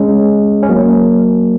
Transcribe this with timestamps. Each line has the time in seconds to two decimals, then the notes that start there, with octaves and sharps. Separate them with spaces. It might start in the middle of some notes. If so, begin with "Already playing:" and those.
Already playing: G#3 C#4
0.63 C#4
0.69 F#3 A#3